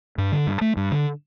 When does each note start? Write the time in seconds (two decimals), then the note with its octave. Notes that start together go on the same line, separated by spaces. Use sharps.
0.18 G2
0.32 D3
0.47 G2
0.61 A3
0.77 G2
0.92 D3